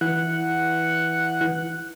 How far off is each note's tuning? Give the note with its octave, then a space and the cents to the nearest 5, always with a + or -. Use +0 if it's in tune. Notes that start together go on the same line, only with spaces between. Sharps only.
E3 -5 F#5 +0